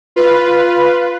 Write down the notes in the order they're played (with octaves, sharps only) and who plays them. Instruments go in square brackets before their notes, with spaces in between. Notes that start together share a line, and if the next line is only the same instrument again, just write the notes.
[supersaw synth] F4 B4